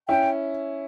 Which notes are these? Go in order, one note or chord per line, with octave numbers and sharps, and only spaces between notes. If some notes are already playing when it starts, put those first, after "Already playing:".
C#4 E4 G5